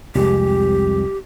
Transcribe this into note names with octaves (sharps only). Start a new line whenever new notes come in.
C2 F2 G#3 G4